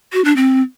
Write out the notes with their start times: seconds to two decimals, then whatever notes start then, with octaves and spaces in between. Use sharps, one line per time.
0.13 F#4
0.25 D4
0.36 C4